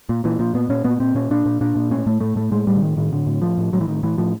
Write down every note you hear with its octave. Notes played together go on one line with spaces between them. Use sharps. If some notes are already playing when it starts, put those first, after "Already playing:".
A#2
A#2 E3
A#2 F3
A#2 B3
A#2 C#4
A#2 B3
A#2 C4
A#2 C#4
A#2 D4
A#2
A#2 D4
A#2
A2 C#4
A2 A3
A2 A3
A2 A3
A2 G#3
A2 G3
D3
A2 D#3
A2 D#3
A2 D3
A2
A2 F3
A2
A2 F#3
E3
A2 D#3
A2 E3
A2 F3